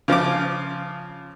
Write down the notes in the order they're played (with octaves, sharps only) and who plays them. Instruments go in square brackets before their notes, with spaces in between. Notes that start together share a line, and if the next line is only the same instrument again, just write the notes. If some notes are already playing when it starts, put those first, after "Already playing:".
[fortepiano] C#3 F3 F4 D6